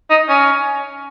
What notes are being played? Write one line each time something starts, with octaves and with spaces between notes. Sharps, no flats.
D#4
C#4